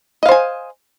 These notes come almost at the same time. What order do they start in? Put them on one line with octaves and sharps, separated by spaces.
D#5 F5 C5 G#5